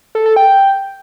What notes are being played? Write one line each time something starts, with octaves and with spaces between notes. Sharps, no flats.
A4
A4
G5